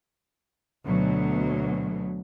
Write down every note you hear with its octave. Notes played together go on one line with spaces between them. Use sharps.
D2 B2 F#3